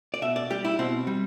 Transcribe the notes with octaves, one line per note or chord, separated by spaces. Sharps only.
D5
B2 E5
D5
G3 G4
E4
B2 C4
G3